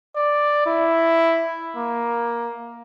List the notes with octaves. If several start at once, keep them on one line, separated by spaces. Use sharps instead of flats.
D5
E4
A#3